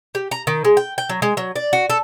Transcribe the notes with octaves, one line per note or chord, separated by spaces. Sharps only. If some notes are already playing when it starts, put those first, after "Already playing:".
G4
A#5
D#3
G#3
G5
G5
F#3
G#3
F#3
D5
F#4
A4